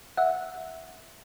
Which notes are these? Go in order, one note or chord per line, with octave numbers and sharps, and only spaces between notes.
E5 F#5